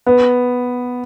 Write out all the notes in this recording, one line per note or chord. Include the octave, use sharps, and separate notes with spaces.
B3